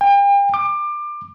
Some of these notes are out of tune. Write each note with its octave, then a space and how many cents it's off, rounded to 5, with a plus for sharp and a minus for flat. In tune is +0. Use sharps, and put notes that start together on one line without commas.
G5 +40
D6 +25